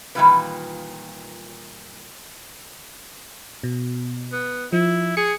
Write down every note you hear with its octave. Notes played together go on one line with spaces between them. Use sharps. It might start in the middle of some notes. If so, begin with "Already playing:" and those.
A#2 D#3 E3 G3 F4 B4
B2
B3
F3 E4
G#4 C#7